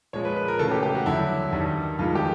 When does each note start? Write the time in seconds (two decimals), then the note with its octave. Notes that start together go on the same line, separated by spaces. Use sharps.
0.13 A#2 F3 G#3 C#5
0.25 B4
0.36 B4
0.48 A#4
0.59 C#3 E3 A3 A4
0.71 G4
0.83 G4
0.95 F#4
1.06 G2 D3 F#3 E4
1.52 G2 D#3 G3
1.99 G2 D#3 G#3 F4
2.15 G4